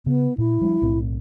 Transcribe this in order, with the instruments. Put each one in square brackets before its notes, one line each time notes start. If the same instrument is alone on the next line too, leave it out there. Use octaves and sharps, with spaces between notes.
[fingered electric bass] C#3 [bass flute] B3
[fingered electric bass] A#2 [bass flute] E4
[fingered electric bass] F3 G3 D4
B1 A2 C4